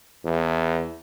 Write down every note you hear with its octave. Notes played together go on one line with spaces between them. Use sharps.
E2